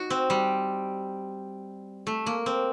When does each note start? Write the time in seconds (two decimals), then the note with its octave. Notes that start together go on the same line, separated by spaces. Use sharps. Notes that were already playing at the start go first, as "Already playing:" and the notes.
Already playing: D#4 F#4
0.10 C4
0.30 G3
2.07 A3
2.26 A#3
2.46 C4